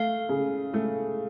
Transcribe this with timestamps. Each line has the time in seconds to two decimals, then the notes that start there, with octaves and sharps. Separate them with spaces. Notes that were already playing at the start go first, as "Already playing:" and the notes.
Already playing: A3 F5
0.29 C#3
0.74 A3